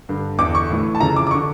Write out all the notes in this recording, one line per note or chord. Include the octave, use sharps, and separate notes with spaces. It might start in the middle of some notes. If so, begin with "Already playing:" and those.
G2 D3
E2 D3 D6
C#6
A2 E3
A5
F2 C#3 E3 A#5
D6
D6
C#6
D3